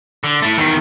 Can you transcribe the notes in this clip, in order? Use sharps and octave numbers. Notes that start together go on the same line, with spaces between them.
D3
A3 E4
E2 D#3